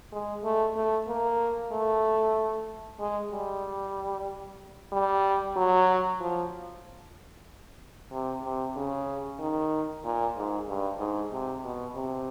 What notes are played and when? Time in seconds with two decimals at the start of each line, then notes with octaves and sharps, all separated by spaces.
0.12 G#3
0.44 A3
0.76 A3
1.08 A#3
1.72 A3
3.00 G#3
3.31 G3
4.92 G3
5.56 F#3
6.20 F3
8.11 C3
8.44 C3
8.76 C#3
9.39 D#3
10.04 A#2
10.36 G#2
10.68 G2
10.99 G#2
11.32 C3
11.64 B2
11.95 C3